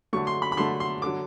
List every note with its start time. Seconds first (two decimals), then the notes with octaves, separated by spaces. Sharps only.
0.13 D3 F#3 A3 C#6
0.27 C6
0.42 B5
0.52 B5
0.57 D3 F#3 A3 C6
0.80 C6
1.02 D3 F#3 D6